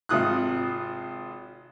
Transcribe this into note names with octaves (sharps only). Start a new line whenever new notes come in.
G#1 C3 F4 D#6 F#6